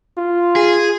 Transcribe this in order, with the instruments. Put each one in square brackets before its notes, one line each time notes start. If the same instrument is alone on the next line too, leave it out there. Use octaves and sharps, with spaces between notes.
[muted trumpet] F4
[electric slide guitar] G#4